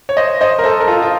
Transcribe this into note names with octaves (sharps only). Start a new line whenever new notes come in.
C#5
C5 D#5
C5 D#5
A#4
A4 C5
A#4
F4 A4
F4